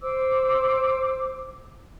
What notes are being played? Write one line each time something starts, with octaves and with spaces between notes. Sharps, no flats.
C5 D6 E6